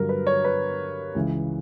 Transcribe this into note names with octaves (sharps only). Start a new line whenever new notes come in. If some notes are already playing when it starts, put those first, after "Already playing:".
Already playing: G2 D3 F#3 A#4
B4
C#5
B4
C#2 C#3 E3